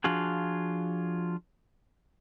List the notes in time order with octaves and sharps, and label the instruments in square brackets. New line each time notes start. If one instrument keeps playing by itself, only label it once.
[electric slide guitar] F3 D4 F4 F#4 G#4